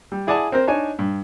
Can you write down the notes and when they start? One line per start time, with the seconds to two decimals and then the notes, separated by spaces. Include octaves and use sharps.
0.12 G3
0.27 E4 G#4 D5 F#5 G#5 A5
0.52 C4 A#4 C5
0.67 D4 D#4 C#5 G#5
0.99 G2